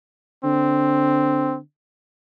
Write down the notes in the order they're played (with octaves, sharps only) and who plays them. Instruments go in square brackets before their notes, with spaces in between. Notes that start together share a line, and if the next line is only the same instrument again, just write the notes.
[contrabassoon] D3 [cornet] C4